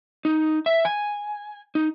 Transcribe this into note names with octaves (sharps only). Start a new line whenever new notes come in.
D#4
E5
G#5
D#4